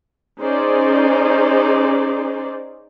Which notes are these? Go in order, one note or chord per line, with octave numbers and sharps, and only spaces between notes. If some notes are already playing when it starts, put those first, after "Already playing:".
C#4 D#4 G#4 C5 D5